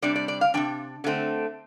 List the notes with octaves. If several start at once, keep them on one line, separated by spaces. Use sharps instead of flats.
C3 G3 D4 D5
D5
D5
F5
C3 G3 D4 G5
D3 A3 C4